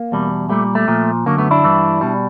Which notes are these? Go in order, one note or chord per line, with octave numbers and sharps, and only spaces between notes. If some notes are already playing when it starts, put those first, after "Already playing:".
Already playing: A#3
E2 B2 G3
A#2 G3 A3
A3
A#2 F3
F#2 D3 F#3 A#3
A3 B3
D4 E4
G2 E3 G3
B2 G3